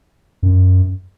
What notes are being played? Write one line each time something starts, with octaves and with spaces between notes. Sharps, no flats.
F#2